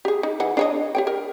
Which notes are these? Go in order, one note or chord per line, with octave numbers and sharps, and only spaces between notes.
G4 G#4
D#4
E3 G#4 F#5
D4 C#5 D#5
G4 C#5 G5
A#4